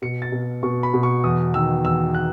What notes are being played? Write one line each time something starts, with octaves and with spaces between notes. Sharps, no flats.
B2 C#7
A6
B2
B2 C#6
B5
B2
C#6
E2 D#6
D#3 E6
E2 E6
F#6